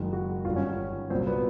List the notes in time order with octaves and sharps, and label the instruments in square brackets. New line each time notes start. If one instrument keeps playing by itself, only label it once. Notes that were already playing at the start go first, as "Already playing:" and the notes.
Already playing: [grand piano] F#1 F#2 D#3 G#3
[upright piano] F#4
[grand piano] G1 G2 D#3 [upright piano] F4
[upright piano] C#4
[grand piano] C2 A#2 F#3 [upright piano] C4
[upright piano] B3